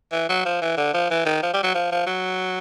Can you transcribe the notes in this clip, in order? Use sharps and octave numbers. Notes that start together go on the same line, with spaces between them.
E3
F#3
F3
E3
D3
F3
E3
D#3
F3
G3
F#3
F3
F3
F#3